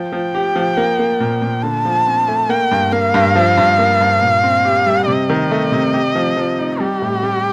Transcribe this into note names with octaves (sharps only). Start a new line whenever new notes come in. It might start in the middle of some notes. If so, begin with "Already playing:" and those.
Already playing: F3 G5
F3
G4
F3
A#3
A#3
A#2
A#2
D3 A5
F3
C4
A3
A#3 G5
G2
A#3 F5
G2
F3
G2
A#3
G2
A#2
C4
G4
G3
C3 D#5
D#3
A3
C3
G4
F3
F3
D#4
G3 G4
A2
G3